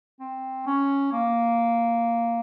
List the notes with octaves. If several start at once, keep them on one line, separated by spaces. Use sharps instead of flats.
C4
C#4
A#3